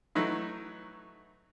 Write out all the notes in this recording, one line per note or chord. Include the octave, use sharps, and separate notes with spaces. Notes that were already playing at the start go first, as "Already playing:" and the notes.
E3 F#3 A3 D#4 E4